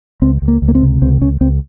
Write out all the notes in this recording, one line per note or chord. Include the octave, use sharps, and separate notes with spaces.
C#2 C4
C#2
A#3
C#2
A#3
C4
C3
C#2 C4
C#2 C#4
C#2 C4